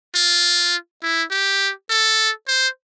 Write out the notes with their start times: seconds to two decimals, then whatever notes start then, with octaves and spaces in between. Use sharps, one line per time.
0.15 F4
1.03 E4
1.31 G4
1.90 A4
2.48 C5